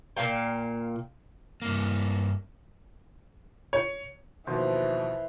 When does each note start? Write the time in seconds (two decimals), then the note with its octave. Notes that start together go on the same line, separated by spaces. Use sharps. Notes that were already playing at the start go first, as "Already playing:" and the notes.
0.17 A#2 A#3 F5 G5
1.62 G2 A#3
3.73 C#5
4.47 D#2 B2 E3 F3 C5